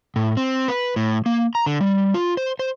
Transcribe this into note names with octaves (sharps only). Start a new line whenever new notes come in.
A2
C4
B4
A2
A#3
A#5
D3
G3
F4
C5
C5